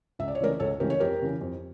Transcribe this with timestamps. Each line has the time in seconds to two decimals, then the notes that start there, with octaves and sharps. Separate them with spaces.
0.19 C#2 E5
0.28 D5
0.35 C#5
0.40 C#3 E3 A3 A#4 D5
0.60 C#2 A4 C#5
0.80 C#3 E3 A3 G4 A#4
0.90 C#5
1.00 F2 G4 A#4
1.22 C#3 E3
1.41 F2